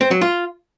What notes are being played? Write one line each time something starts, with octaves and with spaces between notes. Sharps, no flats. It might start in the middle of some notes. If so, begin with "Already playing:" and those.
C4
F#3
F4